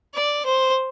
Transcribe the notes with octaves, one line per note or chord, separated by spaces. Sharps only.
D5
C5